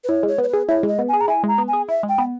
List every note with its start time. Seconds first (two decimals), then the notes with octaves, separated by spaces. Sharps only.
0.04 B4
0.09 E4 C#5
0.23 G#3 C#5
0.38 B3 C#5
0.48 B4
0.53 G#4
0.69 E4 C#5
0.83 G#3 D#5
0.99 B3
1.08 G#4 G#5
1.21 A#5
1.28 E4 G#5
1.43 G#3 A#5
1.58 B3
1.68 G#5
1.73 G#4
1.88 E4 E5
2.03 G#3
2.09 G5
2.18 B3